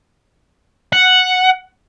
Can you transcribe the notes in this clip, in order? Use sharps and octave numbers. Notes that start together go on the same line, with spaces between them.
F#5